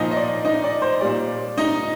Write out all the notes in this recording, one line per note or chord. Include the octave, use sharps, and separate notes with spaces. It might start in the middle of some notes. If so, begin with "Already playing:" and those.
Already playing: A#2 F3 D#4 D#5
D#5
D5
D#4 D#5
D5
C5
A#2 G3 D5
D#4 D#5